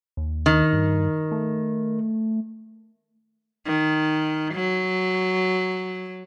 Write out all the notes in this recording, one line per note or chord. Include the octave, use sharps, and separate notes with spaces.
D#2
D#3
G2
A3
D#3
F#3